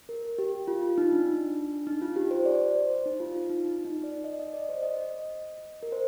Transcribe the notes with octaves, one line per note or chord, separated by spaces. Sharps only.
A#4
G4
F4
F4
D#4
D4
D#4
F4
G4
C5
D5
C5
D#4
F4
F4
D#4
D#4
D#4
D5
D#5
D#5
D5
C5
D#5
A#4
C5